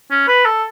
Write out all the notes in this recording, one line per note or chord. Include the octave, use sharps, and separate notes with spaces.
C#4
B4
A4